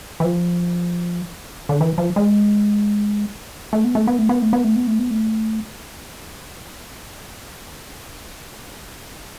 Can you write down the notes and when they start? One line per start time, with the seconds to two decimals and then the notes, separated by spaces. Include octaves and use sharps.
0.20 E3
0.24 F3
1.69 D3
1.81 E3
1.98 F3
2.16 G#3
3.73 A3
3.84 B3
3.95 A3
4.07 B3
4.18 A3
4.29 B3
4.42 A3
4.53 B3
4.64 A3
4.76 B3
4.87 A3
4.99 B3
5.10 A3